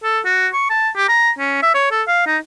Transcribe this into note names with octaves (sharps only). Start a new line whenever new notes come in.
A4
F#4
C#6
A5
G4
A#5
C#4
E5
C#5
A4
F5
D#4